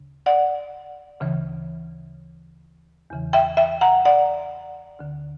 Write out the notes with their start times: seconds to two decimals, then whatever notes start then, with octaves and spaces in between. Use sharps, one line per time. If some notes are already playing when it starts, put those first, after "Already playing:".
Already playing: D2 C#3
0.26 D5 F#5
1.20 D2 C#3 E3
3.10 E2 C#3 E3
3.33 E5 G5
3.57 E5 G5
3.81 F#5 A#5
4.05 D5 F#5
4.99 D2 D3